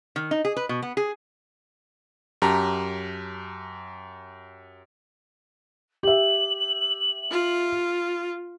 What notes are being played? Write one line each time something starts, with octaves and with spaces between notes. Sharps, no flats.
D#3
D#4
G#4
B4
B2
B3
G#4
F#2 G4 A5 A#5
G4 E5 F#7
F4